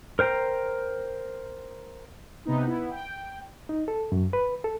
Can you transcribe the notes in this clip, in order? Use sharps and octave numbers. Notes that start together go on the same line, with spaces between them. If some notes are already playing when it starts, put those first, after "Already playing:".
A#4 C5 G5 A#5
C3 B3 D#4
B3 E4
G5
D#4
A4
F#2
B4
A4